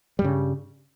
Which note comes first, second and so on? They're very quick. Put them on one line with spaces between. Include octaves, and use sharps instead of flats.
G3 G2 C#3